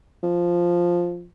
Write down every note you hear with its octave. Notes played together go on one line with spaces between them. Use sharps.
F3